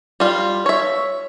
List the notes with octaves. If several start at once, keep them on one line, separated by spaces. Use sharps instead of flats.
G3 F4
C#5 E5